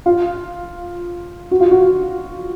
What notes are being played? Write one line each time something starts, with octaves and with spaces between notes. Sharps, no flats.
F4
F#4
F4
F#4